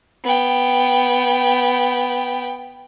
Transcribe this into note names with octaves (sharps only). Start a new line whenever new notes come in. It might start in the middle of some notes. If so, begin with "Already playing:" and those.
B3 G5